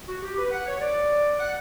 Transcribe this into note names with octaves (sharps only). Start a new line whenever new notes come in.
F#4
G4
B4
F#5
C#5
D5
F#5